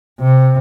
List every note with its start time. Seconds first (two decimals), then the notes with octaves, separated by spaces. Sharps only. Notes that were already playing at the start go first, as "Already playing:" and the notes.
0.20 C3